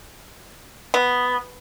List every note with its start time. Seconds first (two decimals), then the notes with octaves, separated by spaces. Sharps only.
0.94 B3